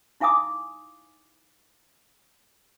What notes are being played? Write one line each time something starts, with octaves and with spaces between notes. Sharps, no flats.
D#4 E4 F5 G#5 D6 D#6